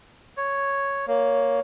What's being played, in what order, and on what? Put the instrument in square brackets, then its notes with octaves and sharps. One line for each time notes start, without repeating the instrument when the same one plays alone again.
[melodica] C#5
[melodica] A#3 [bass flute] C#5